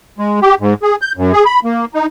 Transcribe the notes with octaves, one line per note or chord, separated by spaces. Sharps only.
G#3
G4
G#2
G#4
G6
F#2
G#4
B5
A#3
D#4